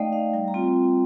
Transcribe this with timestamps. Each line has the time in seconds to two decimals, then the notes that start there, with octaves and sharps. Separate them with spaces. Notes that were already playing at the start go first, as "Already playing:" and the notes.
Already playing: A3 D#4 D5 D#5 F5 G5
0.12 D#4 F5
0.33 G3 G5
0.48 A#5
0.54 C4 F4